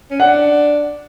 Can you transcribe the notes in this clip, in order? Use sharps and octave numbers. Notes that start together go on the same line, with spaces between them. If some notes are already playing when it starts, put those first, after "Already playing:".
C#4
D4 F#5